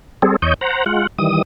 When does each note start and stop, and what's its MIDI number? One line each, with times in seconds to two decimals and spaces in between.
0.22 0.36 55
0.22 0.36 60
0.22 0.36 68
0.22 0.36 69
0.42 0.54 40
0.42 0.54 73
0.42 0.54 75
0.42 0.54 91
0.61 0.84 72
0.61 0.84 78
0.61 0.84 82
0.86 1.07 56
0.86 1.07 65
0.86 1.07 78
1.19 1.42 51
1.19 1.42 52
1.19 1.42 55
1.19 1.42 87